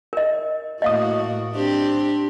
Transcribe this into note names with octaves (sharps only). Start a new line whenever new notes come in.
A#4 D#5
A2 A#3 F#4 D#5 F5 D#6
C4 D4 G4